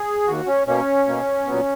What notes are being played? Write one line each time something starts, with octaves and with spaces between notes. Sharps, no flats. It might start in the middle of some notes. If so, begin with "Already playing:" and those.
Already playing: G#4
D#2 D#3 A#3 F#4
C#4
B2 A#3 C#4
B2 A#3
A#2 F#3 B3